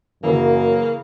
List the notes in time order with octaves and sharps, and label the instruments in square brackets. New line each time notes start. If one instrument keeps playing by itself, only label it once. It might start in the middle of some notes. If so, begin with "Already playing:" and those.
[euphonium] F#2 [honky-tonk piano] C#3 E3 [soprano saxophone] A#3